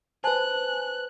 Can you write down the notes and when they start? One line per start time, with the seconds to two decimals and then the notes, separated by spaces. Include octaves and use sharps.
0.24 B4 C5 G#5 A5 F#6